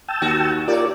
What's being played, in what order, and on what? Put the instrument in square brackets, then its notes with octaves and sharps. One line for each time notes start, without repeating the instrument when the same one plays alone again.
[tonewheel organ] G5 A5 E6
[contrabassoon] D#2 [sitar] F#4
[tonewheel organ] F4 G4 A#4 [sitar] C#5 D5